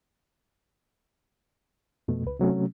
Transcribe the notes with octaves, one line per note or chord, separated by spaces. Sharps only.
F2 B2 A3
C#2 B4
C3 F#3 A3 C#4